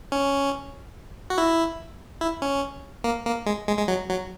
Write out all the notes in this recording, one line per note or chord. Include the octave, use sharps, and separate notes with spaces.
C#4
F#4
E4
E4
C#4
A#3
A#3
G#3
G#3
G#3
F#3
F#3